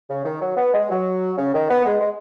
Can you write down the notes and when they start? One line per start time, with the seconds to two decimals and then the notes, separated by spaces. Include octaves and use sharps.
0.10 C#3
0.25 D#3
0.42 F#3
0.57 B3
0.74 G#3
0.90 F#3
1.38 C#3
1.54 D#3
1.70 B3
1.86 G#3
2.00 G#3